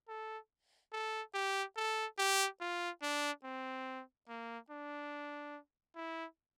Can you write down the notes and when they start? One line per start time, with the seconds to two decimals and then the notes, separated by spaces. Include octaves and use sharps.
0.09 A4
0.93 A4
1.34 G4
1.77 A4
2.19 G4
2.61 F4
3.02 D4
3.44 C4
4.29 A#3
4.70 D4
5.96 E4